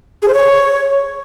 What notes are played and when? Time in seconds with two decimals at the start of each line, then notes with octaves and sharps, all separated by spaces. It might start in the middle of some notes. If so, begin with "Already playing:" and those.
0.22 G#4
0.28 C5
0.34 C#5